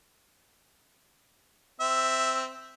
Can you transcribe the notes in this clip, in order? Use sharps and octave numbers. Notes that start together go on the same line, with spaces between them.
C4 E5